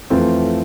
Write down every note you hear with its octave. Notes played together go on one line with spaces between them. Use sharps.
F2 E3 A3 C4 F4